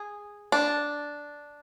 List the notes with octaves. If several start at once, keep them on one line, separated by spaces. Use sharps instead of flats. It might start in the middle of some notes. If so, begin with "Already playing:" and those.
Already playing: G#4
D4